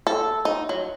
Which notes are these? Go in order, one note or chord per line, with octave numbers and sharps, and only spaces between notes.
A4
D#4
F#3